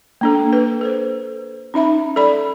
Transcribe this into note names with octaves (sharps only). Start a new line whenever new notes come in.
A#3 D4 A4
B4
A4 C5
C#4 D#4 E5 B5
A4 D5 B5